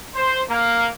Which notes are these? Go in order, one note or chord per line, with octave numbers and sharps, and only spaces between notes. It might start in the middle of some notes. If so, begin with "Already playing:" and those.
C5
A#3